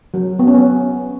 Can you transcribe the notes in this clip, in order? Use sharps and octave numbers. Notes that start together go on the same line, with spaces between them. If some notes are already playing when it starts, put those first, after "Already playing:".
F#3
B3
C#4
B3